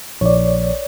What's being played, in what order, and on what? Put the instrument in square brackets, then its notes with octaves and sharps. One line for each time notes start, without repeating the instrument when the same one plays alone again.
[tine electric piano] A#1 [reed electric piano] C#5 D5